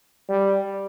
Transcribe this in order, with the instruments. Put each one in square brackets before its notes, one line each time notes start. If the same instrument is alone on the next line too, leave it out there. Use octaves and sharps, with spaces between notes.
[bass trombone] G3